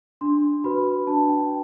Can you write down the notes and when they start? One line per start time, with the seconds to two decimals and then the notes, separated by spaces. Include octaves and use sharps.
0.21 D4 C6
0.64 F#4 B4 B5
1.07 D4 A5
1.29 G5